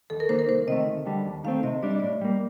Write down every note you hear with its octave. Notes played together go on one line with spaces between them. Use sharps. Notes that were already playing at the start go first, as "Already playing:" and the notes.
D#2 A4
A#4
D#3 A#3 C5
A#4
C2 C5
C3 D#3 A3 D#5
D2
D3 G3 G5
D#2
D#3 A3 C4 F5
C3 D#5
G3 D4 D5
D#5
A2 D5
G3 A#3